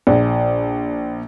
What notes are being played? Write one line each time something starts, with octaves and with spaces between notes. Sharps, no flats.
A#1